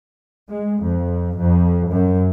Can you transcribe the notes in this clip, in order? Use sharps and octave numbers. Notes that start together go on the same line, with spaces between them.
G#3
F2
F2
F#2